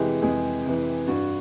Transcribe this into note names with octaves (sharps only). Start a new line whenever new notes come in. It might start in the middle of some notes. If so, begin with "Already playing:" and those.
Already playing: F2 C3 E3 G#3 G4 G#4
F2 G#3 G#4
C3 E3
G2 F#4